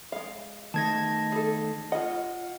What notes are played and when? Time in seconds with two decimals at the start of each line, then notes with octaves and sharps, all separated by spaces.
0.12 G#3 F5
0.74 D#3 A3 D#4 A5 G#6 A#6
1.32 G#4 A4
1.92 F4 D#5 F#5